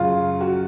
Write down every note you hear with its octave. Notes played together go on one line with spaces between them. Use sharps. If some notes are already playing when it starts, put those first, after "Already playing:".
Already playing: F#2 C#3 F#3 F4
F#4